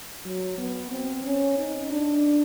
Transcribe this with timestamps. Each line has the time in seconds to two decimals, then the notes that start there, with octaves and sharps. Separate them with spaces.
0.25 F#3
0.58 B3
0.91 C4
1.25 C#4
1.58 D#4
1.92 D4